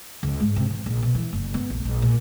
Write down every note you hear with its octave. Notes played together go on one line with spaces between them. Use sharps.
C#2
G#2
C3
E3
A#1
B2
E3
F#1
B3
A#1
A#1
A#2